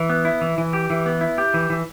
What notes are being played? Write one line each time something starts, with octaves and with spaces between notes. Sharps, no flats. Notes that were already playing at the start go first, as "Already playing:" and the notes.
Already playing: E3
B3
E4
E3
E3
G4
E3
B3
E4
G4
E3
E3